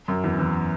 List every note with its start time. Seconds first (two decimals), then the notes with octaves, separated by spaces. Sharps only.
0.08 F#2
0.24 E2
0.39 E2